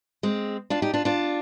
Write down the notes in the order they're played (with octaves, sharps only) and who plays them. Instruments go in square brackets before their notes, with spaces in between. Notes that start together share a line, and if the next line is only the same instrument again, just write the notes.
[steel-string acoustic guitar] G#3 C4
D4 F4
D#4 G4
D4 F4
D4 F4